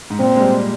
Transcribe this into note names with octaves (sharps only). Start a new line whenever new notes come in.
G#2
A#2 C4
G#3
G3